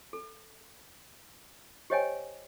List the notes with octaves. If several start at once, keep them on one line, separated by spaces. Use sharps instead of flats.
A4
G4 C5 C#5 D#5 G5 G#5